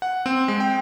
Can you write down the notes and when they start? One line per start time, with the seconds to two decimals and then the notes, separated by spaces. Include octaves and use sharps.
0.02 F#5
0.26 C4
0.48 G#3
0.60 G5